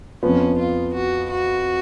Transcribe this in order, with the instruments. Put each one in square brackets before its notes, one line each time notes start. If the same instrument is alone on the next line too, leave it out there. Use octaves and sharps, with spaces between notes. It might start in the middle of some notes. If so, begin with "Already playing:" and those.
[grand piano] F2 F3 B3 [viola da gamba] C#4
[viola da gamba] F4
F#4
F#4